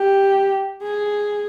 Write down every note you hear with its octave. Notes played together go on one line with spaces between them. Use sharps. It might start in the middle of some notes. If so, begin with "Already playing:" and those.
Already playing: G4
G#4